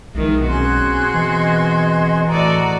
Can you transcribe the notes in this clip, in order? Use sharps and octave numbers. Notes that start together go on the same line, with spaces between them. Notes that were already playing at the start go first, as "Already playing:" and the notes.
B1 D#3 E3 G#3
B2 C4 C#4 F#4 G#4 C6 F#6
E3 D#5
A2 F#4 A4 D5 D#5 A#5